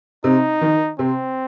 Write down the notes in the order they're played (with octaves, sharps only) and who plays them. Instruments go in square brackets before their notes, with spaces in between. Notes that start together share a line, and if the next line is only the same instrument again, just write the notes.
[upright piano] C3 [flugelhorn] D#4
[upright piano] D#3
[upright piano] C3 [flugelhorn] C4